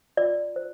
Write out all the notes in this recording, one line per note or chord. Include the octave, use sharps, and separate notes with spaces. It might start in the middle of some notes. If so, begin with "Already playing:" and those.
F4 D5
C5